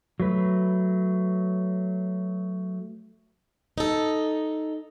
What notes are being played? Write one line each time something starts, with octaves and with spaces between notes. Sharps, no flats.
F#3 A3 B4
D#4 A4